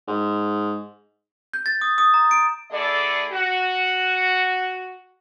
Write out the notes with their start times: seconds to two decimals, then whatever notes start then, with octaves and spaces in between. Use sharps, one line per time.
0.07 G#2
1.54 G6
1.66 A6
1.81 D#6
1.98 D#6
2.14 A#5
2.31 D7
2.72 D3 A3 E4 G#4 A4 D5
3.32 F#4